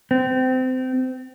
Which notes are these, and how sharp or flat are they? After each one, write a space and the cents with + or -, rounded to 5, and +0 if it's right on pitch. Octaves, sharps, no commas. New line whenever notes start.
C4 -25